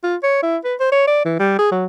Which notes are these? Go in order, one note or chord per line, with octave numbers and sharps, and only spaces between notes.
F4
C#5
E4
B4
C5
C#5
D5
E3
G3
G#4
F#3